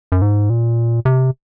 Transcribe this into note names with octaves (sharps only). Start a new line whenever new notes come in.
F#2
G#2
A#2
C3